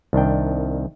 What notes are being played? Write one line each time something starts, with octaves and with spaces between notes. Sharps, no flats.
C2 D#3 D4 G5